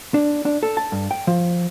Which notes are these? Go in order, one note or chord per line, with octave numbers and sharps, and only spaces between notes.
D4
D4
A4
A5
G2
G5
F3